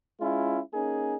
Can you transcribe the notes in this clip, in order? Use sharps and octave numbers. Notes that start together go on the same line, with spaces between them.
G#3 C#4 E4 F4
A#3 C#4 D#4 G#4